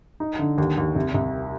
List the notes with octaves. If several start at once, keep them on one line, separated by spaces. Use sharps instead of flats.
D#4
D3
D#2
D#2
C2
C2